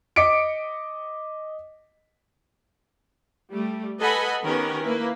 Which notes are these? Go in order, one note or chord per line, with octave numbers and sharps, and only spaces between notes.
D#5 D6 B6 C#7 D7
G3 A3
A4 B4 D#5 F#5 G#5 B5
D#3 B3 C#4 G4 A#4 B4
A#3 E4 B4